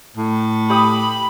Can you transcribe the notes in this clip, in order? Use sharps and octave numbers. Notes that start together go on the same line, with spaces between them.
A2
G4 B5 D#6